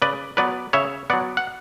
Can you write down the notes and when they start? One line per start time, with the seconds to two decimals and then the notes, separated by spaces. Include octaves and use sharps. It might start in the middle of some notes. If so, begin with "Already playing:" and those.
0.02 C#3 B4 D5
0.37 F#3 B3 B4 D5
0.73 C#3 C#5 E5
1.10 F#3 B3 D5 F#5
1.37 F#5